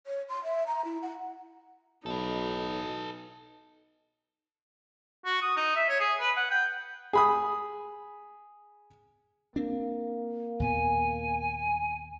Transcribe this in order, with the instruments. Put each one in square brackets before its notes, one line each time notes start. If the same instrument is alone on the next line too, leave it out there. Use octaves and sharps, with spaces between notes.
[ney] C#5
C6
E5
A#5
E4
F#5
[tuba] B1 [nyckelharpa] D#4 [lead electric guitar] A4 B4
[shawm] F#4
D#6
D#4
E5
C#5
G#4
B4
F#5
G5
[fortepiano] G#4 B5 D#6
[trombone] A#3 [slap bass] C4 D4
[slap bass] D#2 A#2 B3 [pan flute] G#5